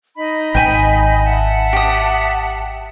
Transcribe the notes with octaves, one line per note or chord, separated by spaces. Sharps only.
D#4 D#5 B5
G#1 G5 G#5
E5 F#5 A5
G4 D#6